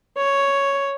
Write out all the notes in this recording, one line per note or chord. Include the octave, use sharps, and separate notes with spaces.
C#5